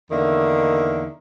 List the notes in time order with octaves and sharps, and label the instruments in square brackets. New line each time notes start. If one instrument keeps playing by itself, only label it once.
[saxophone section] E2 D3 D#3 A#3 E5